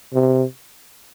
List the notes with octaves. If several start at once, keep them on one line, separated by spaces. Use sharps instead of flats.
C3